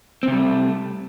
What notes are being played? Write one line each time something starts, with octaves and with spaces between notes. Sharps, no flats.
C3 G3 A3 C4